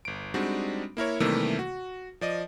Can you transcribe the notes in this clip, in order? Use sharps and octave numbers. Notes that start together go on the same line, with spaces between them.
G1 D7
G3 G#3 C4 D4 D#4 F#4
A#3 E4 A#4 C#5
C3 D#3 E3 G3 A3 A#3
F#4
F3 D5 D#5